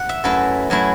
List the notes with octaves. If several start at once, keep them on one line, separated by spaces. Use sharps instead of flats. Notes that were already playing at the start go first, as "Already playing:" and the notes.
Already playing: F#5
E5
F#2 F#3 A3 E4 B4
F#2 F#3 A3 E4